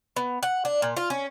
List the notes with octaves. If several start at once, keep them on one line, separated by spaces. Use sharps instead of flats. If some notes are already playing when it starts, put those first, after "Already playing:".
B3
F#5
D4
A#2
F4
C#4